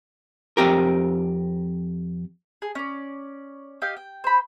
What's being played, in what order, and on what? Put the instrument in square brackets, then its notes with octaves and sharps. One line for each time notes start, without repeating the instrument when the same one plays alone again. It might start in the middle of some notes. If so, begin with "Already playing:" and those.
[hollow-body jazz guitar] F2 C4 G4 A#4
[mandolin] G#4
C#4 D5
G4 D#5 F5
G5
C5 B5